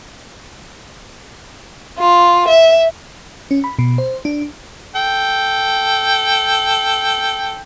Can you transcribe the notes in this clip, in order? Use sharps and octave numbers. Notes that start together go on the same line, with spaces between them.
F4
E5
C#4
B5
B2
C5
D4
A4 G5